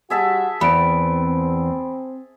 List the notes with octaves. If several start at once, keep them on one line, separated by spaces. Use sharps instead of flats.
G3 F#4 G#4 E5 A5
E2 C4 B5 D7